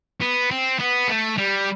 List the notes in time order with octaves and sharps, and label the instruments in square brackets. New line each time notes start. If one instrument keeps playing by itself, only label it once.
[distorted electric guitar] B3
C4
B3
A3
G3